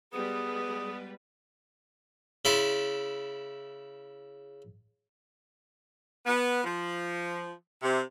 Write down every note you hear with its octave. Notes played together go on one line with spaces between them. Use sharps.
G3 G#3 B3 G#4 B4 D#6
C#3 E4 D5 C6
B3
F3
C3